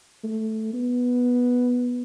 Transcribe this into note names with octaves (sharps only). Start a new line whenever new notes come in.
A3
B3